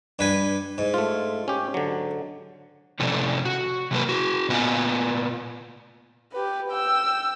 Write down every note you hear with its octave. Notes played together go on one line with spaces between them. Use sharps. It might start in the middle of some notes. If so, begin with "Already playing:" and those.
G2 B4 G#5
G#2
A3 F4
C#4 G4
D3 F#3
F2 A2 C3 C#4 A4 D5
F#4
C3 F#3 A#3 B4
F#4 G#4
A#2 B3 F4 D#5 G#5
G4 B4
G5 E6